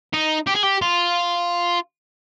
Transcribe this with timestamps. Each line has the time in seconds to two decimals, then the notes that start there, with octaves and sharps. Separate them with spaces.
0.14 D#4
0.47 G4
0.55 G#4
0.63 G4
0.82 F4